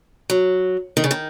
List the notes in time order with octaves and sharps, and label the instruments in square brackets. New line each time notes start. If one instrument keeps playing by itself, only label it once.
[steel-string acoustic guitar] F#3
D#3
C#3
D#3